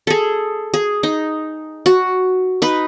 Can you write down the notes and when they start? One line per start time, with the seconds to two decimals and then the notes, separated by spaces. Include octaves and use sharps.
0.07 G#4 A4
0.74 G#4
1.03 D#4
1.86 F#4
2.62 D#4 B4